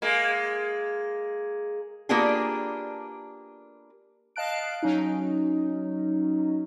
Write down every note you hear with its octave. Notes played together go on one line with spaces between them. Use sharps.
G#3 A#3
A#3 B3 D4 F4 G4 G#4
D#5 F5 A5 F#6 D7
F#3 C#4 D#4